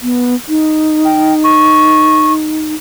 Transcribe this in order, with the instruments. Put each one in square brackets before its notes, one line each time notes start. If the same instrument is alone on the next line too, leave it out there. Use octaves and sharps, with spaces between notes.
[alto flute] B3
D#4
[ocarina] G5
C#6